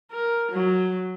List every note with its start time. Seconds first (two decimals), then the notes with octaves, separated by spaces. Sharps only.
0.11 A#4
0.52 F#3